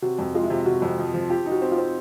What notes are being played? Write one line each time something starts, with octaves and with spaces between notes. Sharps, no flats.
C3 F#4
F2
G#3 F4
E4
C3 F4
C3 F#4
F2
F3
F3
F4 G4
D#4
F#4
C4
F4
C4